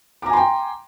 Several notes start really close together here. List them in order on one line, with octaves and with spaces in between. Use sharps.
D6 A#5 G#5 C6 G5